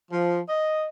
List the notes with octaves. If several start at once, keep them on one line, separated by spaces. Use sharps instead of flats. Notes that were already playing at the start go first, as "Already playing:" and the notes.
F3
D#5